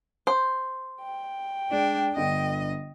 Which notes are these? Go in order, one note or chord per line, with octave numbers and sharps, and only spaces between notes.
C5
G5
G#3 D4 D5
G1 D3 D#5